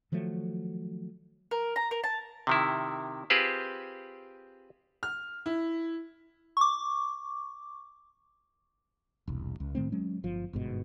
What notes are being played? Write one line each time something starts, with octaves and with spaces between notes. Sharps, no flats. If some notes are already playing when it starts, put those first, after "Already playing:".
D#3 F3 F#3 A3
A#4
A#5
A#4
A5
C3 D#3 E4
C4 F4 G4 G#4 B4 C5
F6
E4
C#6 D6
E1 C2
C#2
A2 D#3 A3 C4
F#3 G#3 C#4
G1 F3
G1 G#2 B2